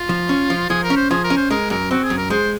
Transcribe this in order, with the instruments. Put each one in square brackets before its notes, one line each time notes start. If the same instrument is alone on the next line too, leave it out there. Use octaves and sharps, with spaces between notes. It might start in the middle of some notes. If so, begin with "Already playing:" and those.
Already playing: [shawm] F4
[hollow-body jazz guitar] F3
C#4
F3
[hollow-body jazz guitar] F3 [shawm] G#4
[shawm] A#4
[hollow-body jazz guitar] C#4
[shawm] C5
[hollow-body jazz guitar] F3 [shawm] G#4
[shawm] A#4
[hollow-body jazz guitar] C#4
[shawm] C5
[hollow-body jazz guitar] G#3 [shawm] A#4
[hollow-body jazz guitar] F#2 [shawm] A#4
[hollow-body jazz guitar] C4 [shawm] F#4
[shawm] G#4
[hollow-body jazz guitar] F#2
[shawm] A#4
[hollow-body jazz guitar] G#3 [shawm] C5